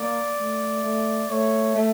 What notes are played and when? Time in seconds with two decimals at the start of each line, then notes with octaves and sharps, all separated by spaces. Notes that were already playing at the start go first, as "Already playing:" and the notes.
Already playing: A#3 D5
0.39 A3
0.83 A3
1.29 A3 C#5
1.75 A3